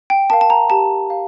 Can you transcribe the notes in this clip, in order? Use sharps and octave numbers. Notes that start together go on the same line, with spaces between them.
G5
A#4 F5 A5
A5
A#5
G4 A5
F5